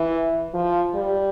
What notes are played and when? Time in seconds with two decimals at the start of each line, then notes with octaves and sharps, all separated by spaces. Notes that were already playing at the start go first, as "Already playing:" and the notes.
Already playing: E3
0.54 F3
0.95 G3